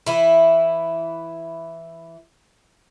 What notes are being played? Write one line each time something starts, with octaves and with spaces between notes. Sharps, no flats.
E3 E4